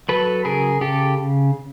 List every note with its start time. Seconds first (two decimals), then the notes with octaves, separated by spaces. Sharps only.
0.09 F#3 A4 B4
0.45 C#3 G#4 A#4
0.81 C#3 G4 A4